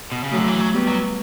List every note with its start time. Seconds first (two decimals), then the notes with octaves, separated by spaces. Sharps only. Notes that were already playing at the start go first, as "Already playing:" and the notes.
0.12 B2
0.24 C#3
0.32 D3 F#3 A3
0.48 E3
0.60 F#3
0.74 G3 B3
0.88 F#3